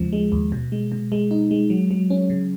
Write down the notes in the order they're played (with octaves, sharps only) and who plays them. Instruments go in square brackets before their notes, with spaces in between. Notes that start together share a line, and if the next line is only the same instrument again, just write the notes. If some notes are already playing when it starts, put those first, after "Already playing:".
Already playing: [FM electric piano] D#2 C#3 F3 G#3
G#3
D#2
B2
G#3
B2
G#3
D#4
G#3
F#3
F#3
C#4
C#3